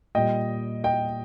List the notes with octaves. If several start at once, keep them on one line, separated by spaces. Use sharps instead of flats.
A#2 G3 D#5 G5
D#5 G5